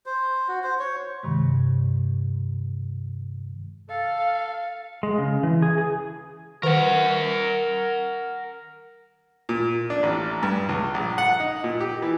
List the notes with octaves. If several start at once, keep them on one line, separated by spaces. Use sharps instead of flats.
C5
F#4
C5
C#5
G2 C3 D#3 G#3
A4 F5
G#3
C#3
E3
G#4
G#4
D#3 A#4 B4 F#5
A#2
D4
A1
G2
C#2
A#1
F#5
D#4
A#2
G4
E3